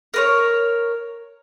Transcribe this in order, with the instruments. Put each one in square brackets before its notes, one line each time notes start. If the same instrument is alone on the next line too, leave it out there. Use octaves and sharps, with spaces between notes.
[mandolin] A#4 B4 C#5